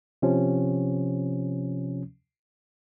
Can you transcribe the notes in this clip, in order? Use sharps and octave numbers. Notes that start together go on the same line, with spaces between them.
C3 F3 C#4